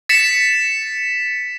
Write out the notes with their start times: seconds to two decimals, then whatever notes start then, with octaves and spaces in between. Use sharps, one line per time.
0.09 A6 B6 C#7 E7